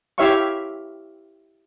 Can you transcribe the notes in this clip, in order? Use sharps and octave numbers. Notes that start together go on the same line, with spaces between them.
E4 G4 C#5 E5 F5 C#6